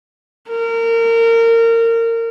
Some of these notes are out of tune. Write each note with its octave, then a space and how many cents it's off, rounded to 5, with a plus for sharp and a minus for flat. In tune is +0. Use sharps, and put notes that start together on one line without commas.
A#4 -25